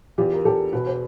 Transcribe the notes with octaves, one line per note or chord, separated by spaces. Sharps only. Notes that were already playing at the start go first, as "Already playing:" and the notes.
E2 F4 G4
A#4
E2 G4 A4
B2 B4
C5